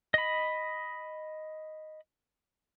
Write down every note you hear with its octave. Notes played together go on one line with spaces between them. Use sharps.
D#5 B5